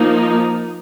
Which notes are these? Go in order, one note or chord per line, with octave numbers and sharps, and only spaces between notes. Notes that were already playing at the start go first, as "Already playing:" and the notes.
Already playing: F3 A#3 D#4